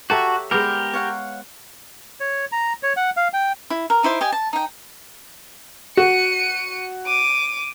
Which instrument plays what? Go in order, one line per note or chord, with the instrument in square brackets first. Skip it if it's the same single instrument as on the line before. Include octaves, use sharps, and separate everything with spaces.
[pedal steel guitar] F#4 [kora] G4 A4 E5 [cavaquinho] C#5 A5 A#5
[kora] G#3 B3 [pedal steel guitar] G4 A#4
[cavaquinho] C#5 F5 F#5
[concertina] C#5
A#5
C#5
F#5
F5
G5
[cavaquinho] E4
A#4
D#4 E4 C5 D6
G4 D#5 G#5
A5
D#4 G5
[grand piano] F#4 [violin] C#7 D#7
[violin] D6 D#7